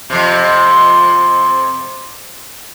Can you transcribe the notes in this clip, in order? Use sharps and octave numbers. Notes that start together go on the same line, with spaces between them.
F2 C3